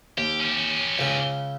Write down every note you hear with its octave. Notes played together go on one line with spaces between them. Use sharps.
D#2 G4
C#4 G4
C#2 C#3